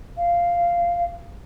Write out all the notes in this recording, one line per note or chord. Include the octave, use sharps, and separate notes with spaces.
F5